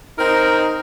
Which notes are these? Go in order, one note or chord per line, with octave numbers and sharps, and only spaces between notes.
C4 D#4 A#4